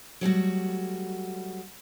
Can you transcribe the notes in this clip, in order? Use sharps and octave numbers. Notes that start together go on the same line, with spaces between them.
F#3 G3 A3 F#4